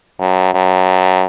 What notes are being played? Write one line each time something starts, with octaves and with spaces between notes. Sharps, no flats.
F#2
F#2